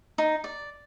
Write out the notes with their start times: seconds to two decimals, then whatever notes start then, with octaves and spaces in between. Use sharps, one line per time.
0.18 D#4
0.44 D5